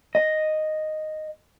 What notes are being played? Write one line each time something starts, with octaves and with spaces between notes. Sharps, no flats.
D#5